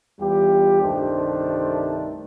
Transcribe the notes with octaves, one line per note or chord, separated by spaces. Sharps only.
E2 G3 F4 G4
C2 G2 D#3 A3 D4 C5